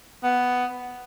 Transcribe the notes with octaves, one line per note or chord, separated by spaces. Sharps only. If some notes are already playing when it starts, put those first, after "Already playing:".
B3